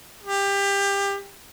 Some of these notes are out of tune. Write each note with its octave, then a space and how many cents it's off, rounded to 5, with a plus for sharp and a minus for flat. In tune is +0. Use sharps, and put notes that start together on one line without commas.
G4 +25